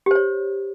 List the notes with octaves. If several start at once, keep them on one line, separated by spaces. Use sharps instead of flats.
G4 C5 C#5